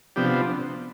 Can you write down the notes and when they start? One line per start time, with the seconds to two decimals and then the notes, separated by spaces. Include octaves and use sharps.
0.16 C3 F3 B3 D4 G4